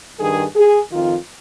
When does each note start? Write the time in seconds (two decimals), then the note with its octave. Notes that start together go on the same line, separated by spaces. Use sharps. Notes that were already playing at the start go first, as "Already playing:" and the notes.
0.20 G2 D#3 G#4
0.56 G#4
0.91 F2 D#3 F4